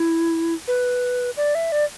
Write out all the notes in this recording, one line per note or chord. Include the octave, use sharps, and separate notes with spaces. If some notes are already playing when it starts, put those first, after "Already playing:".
Already playing: E4
B4
D5
E5
D5